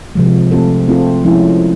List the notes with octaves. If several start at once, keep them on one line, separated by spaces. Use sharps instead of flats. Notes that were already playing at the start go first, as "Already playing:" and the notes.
C3 F3 G#3
A3 C4 F4 A4
A3 C4 F4 A4
F3 G#3 C#4 E4